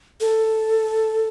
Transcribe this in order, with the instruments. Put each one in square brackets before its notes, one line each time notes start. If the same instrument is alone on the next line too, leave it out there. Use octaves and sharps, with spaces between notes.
[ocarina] A4